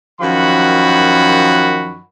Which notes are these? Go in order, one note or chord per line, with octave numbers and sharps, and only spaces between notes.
F#2 D#3 F3 F#4 B5